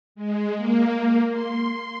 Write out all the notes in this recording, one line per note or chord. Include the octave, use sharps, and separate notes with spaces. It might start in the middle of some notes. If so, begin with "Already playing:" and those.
G#3
A#3
C6